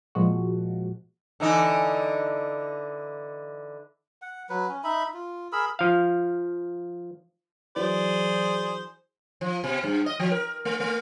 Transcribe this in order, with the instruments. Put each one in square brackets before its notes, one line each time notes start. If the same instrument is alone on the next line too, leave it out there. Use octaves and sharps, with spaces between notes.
[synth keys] A#2 F3 G#3 F#4
[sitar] D3 E3 D#4
[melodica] F#5
F#3 B4
C#4
D#4 E5 B5
F4
G#4 A#4 B5 E6
[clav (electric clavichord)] F3 F5
[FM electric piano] E3 F#3 [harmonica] G#4 C5 [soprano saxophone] D5
[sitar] F3
B2
G2
D#5
F3
A#4
A3
A3